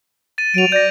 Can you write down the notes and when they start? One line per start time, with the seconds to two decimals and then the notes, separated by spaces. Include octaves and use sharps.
0.38 A6 D#7
0.54 F#3 D7 F7
0.72 D5 G6 A#6